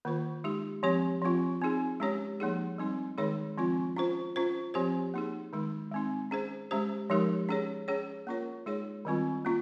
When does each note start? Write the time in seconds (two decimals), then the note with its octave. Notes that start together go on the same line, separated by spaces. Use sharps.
0.05 D#3 A#3 F4 C5
0.44 G#3 D#4 G4
0.83 F3 C4 G4 C#5
1.22 F3 C4 F4
1.61 C4 D#4 G#4
2.00 G#3 C#4 G4 C#5
2.40 F3 A#3 D#4 G#4
2.78 G3 C4 D#4
3.18 D#3 G#3 D#4 G#4 C#5
3.58 F3 C4 F4
3.96 C#4 F4 C5
4.36 C#4 F4 C5
4.74 F3 C4 G4 C5
5.14 A#3 D#4 G#4
5.53 D#3 G#3 D#4
5.92 G#3 C4 D#4
6.31 C#4 G#4 C5
6.71 G#3 C#4 G4 C5
7.10 F3 G#3 D#4 G4 A#4
7.49 C#4 G#4 C#5
7.88 C#4 G#4 C#5
8.27 A#3 C#4 F4 A#4 C#5
8.66 G#3 D#4 G#4 C#5
9.05 D#3 G3 C4 F4
9.45 A#3 C#4 F4